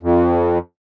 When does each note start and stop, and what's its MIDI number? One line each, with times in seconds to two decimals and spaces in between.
0.03 0.58 41